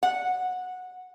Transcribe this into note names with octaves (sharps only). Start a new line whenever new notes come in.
F#5